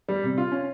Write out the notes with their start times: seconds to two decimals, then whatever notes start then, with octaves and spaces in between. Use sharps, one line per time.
0.08 G3
0.23 C3
0.38 F4
0.52 C#4